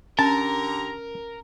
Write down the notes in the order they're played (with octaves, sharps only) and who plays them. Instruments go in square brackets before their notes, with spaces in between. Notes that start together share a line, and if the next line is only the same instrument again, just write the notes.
[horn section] D3 G4 A#5 [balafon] C#4 [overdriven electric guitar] A#4 [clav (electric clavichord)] A5